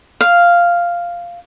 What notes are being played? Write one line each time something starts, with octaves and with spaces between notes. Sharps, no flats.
F5